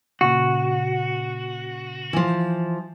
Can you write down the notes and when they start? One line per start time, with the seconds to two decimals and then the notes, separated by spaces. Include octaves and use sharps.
0.21 A#2 C#3 F#4
2.13 E3 F3